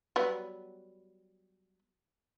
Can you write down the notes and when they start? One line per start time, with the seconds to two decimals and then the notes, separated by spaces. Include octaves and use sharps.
0.16 F#3 G3 B3